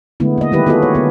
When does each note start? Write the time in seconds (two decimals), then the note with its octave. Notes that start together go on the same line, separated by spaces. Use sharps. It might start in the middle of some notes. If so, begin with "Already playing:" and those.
0.20 D3 G#3 A3 B3 E4
0.38 A#3 D#5
0.52 D#3 F#3 G#3 E4 G4 B4
0.67 B3 F4 F#4 G#4 A4 D#5
0.82 C#5
0.95 D3 B3